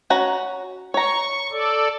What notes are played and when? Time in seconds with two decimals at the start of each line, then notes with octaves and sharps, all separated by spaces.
0.10 C#4 F#4 A#5
0.94 C#5 A#5 C#6
1.52 A4 D5